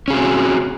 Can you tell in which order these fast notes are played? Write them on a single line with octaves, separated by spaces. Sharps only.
C#4 G#4 F#4 C4